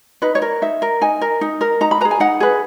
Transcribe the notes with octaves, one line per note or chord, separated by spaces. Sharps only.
D#4 B4
C#5
A#4
D#4 E5
A#4
D#4 G#5
A#4
D#4
A#4
D#4 A#5
B5
B4 A#5
G#4
G#5
D#4 F#5
G#4 B4